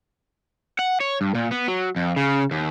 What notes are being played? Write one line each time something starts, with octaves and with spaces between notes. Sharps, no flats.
F#5
C#5
G2
A#2
B3
F#3
F2
C#3
D#2